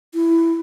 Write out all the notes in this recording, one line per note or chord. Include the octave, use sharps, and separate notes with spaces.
E4